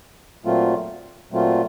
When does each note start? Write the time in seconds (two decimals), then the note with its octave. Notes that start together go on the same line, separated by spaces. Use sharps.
0.45 A#2 F#3 A3 C4 F4
1.32 A#2 F#3 A3 C4 F4